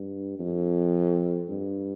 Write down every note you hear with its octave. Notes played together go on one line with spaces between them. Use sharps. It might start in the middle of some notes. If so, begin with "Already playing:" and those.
Already playing: G2
F2
G2